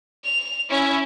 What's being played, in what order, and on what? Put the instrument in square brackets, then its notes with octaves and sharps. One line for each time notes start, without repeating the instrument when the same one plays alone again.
[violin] F7
C#4 E4